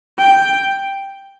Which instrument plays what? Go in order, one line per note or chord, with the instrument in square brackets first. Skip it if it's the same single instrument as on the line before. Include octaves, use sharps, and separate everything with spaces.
[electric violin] G5